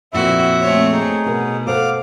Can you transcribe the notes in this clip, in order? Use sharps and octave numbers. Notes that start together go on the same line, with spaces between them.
F2 A#2 A#3 C4 E4 F#4 E5
A3 C4 C#5
D#4 G#4
B2 A#4 F#5
A4 C5 F5 F#5 D6